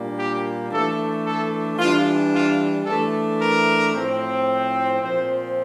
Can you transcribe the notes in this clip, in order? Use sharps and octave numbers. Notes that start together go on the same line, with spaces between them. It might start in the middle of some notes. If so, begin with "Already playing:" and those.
Already playing: A#2 G3 A#3 D4
G4
E3 A3 D4 A4
A4
E3 G3 D4 F4
F4
E3 A3 D4 A4
A#4
A2 F3 C4
A#2 F3 C4 C5